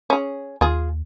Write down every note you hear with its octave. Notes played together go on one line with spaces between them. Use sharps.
C#4 G#4
D#2 F4 G#4